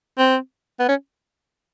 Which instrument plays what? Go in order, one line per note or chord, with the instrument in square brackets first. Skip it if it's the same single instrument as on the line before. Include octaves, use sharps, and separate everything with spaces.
[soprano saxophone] C4
B3
C#4